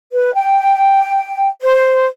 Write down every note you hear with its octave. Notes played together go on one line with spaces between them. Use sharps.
B4
G5
C5